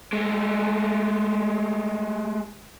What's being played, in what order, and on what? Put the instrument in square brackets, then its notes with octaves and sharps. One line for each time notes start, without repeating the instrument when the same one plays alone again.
[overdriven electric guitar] G#3 A3